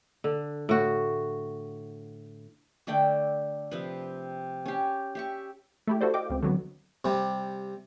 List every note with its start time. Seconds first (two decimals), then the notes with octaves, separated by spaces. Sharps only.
0.24 D3
0.69 A2 F#4
2.87 D3 A3 D4 G5
3.71 C3 F3 B4
4.66 C#4 G4
5.15 G4 E5 C#6
5.88 A3 E4 G4
6.01 E4 F#4 A4 C5 D5
6.14 D#5 F5 G5 D6
6.30 C#2 C4
6.43 D3 F#3 B3
7.05 C3 G3